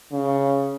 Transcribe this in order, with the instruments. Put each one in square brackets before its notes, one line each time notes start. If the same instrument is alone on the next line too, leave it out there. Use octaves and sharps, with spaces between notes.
[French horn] C#3